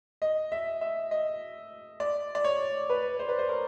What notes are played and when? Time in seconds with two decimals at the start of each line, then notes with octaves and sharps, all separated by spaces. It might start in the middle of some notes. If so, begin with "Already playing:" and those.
0.22 D#5
0.52 E5
0.81 E5
1.11 D#5
2.00 D5
2.35 D5
2.44 C#5
2.90 B4
3.19 C5
3.29 B4
3.39 C5
3.49 A#4